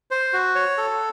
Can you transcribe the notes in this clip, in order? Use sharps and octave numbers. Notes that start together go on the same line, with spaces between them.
C5
F#4
C#5
A4